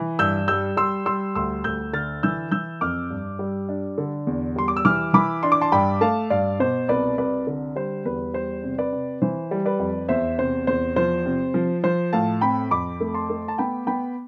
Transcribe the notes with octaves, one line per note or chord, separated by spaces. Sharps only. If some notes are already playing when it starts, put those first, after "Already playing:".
Already playing: E3
G2 E6 G6
G3 E6 G6
G3 C6 E6
G3 C6 E6
D2 C6 E6
D2 E6 G6
D3 F6 A6
E3 E6 G6
E3 E6 G6
F2 D6 F6
G2
G3
D4
D3
E2
G3 C6
D6
E6
E3 D6 F6
E3 B5 D6
D4 C6
D6
A5 C6
G2 G5 B5
A3 F5 A5
G2 D5 F5
B2 C5
C2 B4 D5
C2 B4 D5
D3
G3 C5
E2 B4
G3 C5
C3
B4 D5
C3
E3 C5
G3
B4 D5
F2
E2 C5 E5
C3 C5
E2 C5
F3 C5
C3
F3
F3 C5
A2 F5 A5
C4 G5 B5
F2 B5 D6
A3
A5 C6
A3
A5
B3 G5 B5
B3 G5 B5